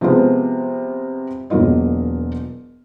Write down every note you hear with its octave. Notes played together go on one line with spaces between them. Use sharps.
C3 F3 G#3 B3 F4
E1 F#3 A#3 F4 D#5